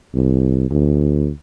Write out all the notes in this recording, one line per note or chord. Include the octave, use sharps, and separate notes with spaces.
C2
D2